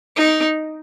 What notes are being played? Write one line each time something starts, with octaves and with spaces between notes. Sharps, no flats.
D#4